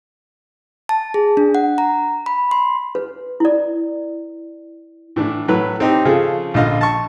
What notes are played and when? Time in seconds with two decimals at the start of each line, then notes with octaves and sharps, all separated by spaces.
0.89 A5
1.14 G#4
1.37 D4
1.55 F#5
1.78 A#5
2.26 B5
2.51 C6
2.95 B4
3.40 E4 D5
5.16 A2 E3 D4
5.48 A2 F#3 B4
5.80 C4 D#4 G4
6.05 C#3 F3 F4 G#4 A4
6.54 A#1 D3 F4 D#5 F5
6.81 A5 C#6